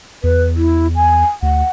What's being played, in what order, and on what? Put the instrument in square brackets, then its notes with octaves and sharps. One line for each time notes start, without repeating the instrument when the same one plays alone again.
[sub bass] E2 [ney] B4
[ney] E4
G#5
[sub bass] D2 [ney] F#5